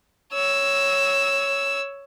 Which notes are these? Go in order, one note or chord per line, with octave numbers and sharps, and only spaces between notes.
C#5 E6